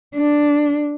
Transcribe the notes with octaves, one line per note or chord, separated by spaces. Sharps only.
D4